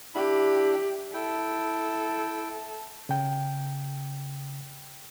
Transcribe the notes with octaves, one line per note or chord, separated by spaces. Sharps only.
D4 E4 G4 B5
E4 A4 G5
C#3 G5